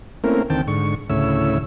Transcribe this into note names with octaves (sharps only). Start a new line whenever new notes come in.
A3 A#3 C4 C#4 E4 A#4
D2 D#3 C4 G5 A5
G#2 D3 C#6
D2 A2 C#3 E4 C#5 E6